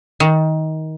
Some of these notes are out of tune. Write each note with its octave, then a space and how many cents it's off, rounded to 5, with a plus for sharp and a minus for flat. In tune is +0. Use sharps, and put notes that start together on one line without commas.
D#3 +20